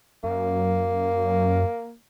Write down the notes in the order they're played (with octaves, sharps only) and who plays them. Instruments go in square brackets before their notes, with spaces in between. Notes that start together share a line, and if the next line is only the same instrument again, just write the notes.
[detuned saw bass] F#2 [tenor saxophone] A#3